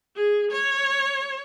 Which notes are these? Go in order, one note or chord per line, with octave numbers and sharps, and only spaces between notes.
G#4
C#5